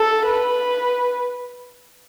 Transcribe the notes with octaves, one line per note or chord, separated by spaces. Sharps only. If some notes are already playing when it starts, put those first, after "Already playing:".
Already playing: A4
B4